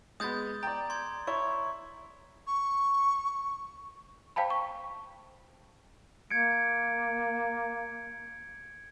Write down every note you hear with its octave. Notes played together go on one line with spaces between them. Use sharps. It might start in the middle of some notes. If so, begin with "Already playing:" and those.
G#3 B3 D#6 G6 A6
D5 G5 A#5
C6 G#6
E4 C#5 C#6
C#6
C5 F5 G5 A5 B5
C#6
A#3 G#6 C#7 D7